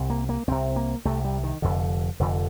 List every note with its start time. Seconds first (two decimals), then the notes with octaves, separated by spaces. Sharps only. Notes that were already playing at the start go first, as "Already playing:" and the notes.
Already playing: C2 C3
0.10 A#3
0.29 A#3
0.48 C2 C3 C4
0.76 A#3
1.05 C2 C3 A3
1.25 G3
1.43 D#3
1.62 F1 F2 D3
2.19 F1 F2 D3